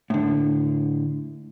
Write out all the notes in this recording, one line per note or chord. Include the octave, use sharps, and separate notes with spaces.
A2 D3